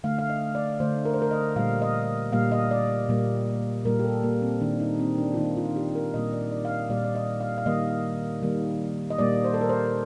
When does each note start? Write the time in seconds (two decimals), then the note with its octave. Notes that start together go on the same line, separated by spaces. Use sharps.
0.04 D3 A3 F5
0.19 F5
0.30 D#5
0.55 D5
0.80 D3 A3 C5
1.05 A#4
1.14 C5
1.22 A#4
1.31 D#5
1.56 A#2 G3 A#3 F5
1.82 D#5
2.32 A#2 G3 A#3 F5
2.52 D#5
2.71 D5
3.09 A#2 G3 A#3
3.85 A#2 G3 A#3 A#4
3.99 G4
4.04 A4
4.23 A#3
4.42 C4
4.61 D#3 A#3 D4
4.80 D#4
4.99 C4
5.18 D4
5.34 F4
5.37 D#3 A#3 D#4
5.57 F4
5.76 G4
5.95 A#4
6.14 A#2 G3 A#3 D#5
6.33 D5
6.52 D5
6.65 F5
6.70 D#5
6.90 A#2 G3 A#3 D5
7.04 D5
7.15 D#5
7.41 F5
7.58 F5
7.66 D#3 G3 A#3 D#5
8.42 D#3 G3 A#3
9.10 D#5
9.18 A#2 G3 A#3 D5
9.44 C5
9.54 A4
9.61 A#4
9.69 C5